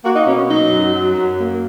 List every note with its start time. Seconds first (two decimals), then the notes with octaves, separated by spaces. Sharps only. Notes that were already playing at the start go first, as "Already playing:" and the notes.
0.05 A#3 F#4
0.16 D#4
0.27 B2 C#4
0.38 C#4
0.49 F#3 D#4
0.71 F#2
0.94 F#3
1.15 F#2
1.38 A#3